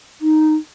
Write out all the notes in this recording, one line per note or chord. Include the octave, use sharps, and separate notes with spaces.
D#4